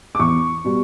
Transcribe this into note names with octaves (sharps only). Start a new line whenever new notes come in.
D6
E2 C#6
B2 G3